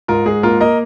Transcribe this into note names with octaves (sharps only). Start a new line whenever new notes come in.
G#2 F4 A#4
G#2 G#4
A#3 F4 A#4
A#3 A#4 D#5